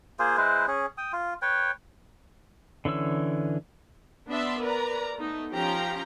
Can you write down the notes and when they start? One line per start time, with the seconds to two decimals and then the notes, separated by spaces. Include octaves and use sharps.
0.19 A#3 F4 G#4 C5
0.37 G#3 E4 B4 C5
0.68 C#4 G#4
0.97 G5 D#6
1.13 F4
1.42 B4 C#5 G5
2.85 D3 E3 C#4 E6
4.29 B3 D4 D5 E5 C6
4.61 A#4 B4 D5 A#5
5.16 A3 B3 D#4
5.52 F3 C#4 G4 F5 G5 A#5